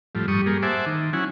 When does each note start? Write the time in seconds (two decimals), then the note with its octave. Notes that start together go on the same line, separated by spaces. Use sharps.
0.15 A2 F3 G3
0.28 G2 G3 C#6 D#6
0.46 G3 A#3 G#4
0.63 C5 E5 F#5 G#5 A5 D6
0.86 D#3
1.13 F#3 C#4 E4 F#5 G#5